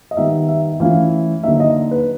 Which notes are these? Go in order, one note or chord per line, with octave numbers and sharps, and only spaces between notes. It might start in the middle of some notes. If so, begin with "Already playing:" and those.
D#5
D#3 G3 B3 D#4 E5
E5
E3 A3 C#4 E4 F5
D3 F#3 A#3 D#4 E5
D#5
B4